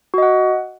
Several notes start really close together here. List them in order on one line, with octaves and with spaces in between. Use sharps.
F#4 D#5 F#5